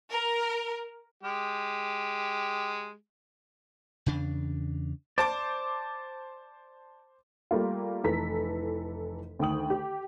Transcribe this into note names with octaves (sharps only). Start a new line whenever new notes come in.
A#4
G#3 G4
E2 C#3 D4
C5 D5 A5 D6
G3 A3 A#3 F4
F1 E3 A4 B4 A#5 B6
D2 D#3 G5 D#6 F#7
G4